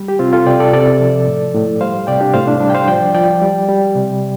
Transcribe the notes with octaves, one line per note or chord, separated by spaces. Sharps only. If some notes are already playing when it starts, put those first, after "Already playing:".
Already playing: G3
G4
C3 C4 F4
F4 A4
C3 D5 G5
A4 D5
C3 A4 D5
F3
A2
A2
G3 C5 F5
C3 D5 G5
D4 G4
A2 C5 F5
D4
G3 D4
G5
C5 F5
F3 D5 G5
F3 D5 G5
G3
G3
C3